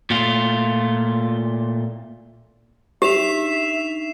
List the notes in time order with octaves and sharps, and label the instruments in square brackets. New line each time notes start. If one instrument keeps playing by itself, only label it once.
[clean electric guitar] A#2 A3 F4
[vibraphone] D4 D#4 C#6 [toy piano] G4 [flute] E5 [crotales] C7 E7 F7